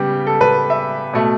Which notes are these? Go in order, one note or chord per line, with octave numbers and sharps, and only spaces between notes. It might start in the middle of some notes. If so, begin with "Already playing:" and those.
Already playing: C#3 G3 B3 G4
A4
B4
E5
B2 A3